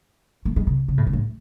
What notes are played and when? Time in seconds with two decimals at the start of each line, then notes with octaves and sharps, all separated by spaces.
0.45 A3
0.56 G#3
0.67 C3
0.88 C3
0.98 A2
1.07 C3
1.13 A2